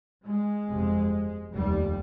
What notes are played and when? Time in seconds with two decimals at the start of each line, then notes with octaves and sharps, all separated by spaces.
0.26 G#3
0.68 G1 F2 C3
1.53 F1 D#2 G3